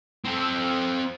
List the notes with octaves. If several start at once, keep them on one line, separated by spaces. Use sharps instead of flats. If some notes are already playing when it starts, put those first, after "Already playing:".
C4 A4